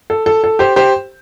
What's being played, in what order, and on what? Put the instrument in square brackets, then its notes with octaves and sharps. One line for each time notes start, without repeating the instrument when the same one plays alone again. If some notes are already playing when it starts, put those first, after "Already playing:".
[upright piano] A4
A4
A4
G4 C5
G4 C5